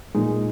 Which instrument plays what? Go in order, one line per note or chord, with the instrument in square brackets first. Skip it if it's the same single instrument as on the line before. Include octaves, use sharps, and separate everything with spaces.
[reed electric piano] A#2 G#3 D#4